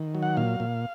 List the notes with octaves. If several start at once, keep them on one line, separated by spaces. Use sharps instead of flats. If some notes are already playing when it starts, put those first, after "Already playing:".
Already playing: D#3
F#3
F#5
A#2 F5
A#2